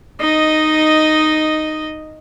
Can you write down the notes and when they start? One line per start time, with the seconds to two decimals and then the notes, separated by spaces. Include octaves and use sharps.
0.20 D#4 D#5